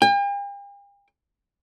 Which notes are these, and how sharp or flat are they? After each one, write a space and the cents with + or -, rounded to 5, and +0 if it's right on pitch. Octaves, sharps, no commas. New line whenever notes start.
G5 +45